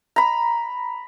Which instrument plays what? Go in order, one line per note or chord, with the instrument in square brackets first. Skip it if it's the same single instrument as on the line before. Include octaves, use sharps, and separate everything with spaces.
[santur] A#5 B5